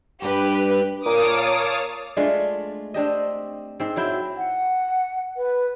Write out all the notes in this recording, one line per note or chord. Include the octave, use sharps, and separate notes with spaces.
G2 D4 G4 B4
A#2 A#4 C#5 F5 A5 D6 D#6
G#3 A3 D4 F4
C4 D4 G4 D#5
G#2 C4
F#3 E4 G5
F#5
B4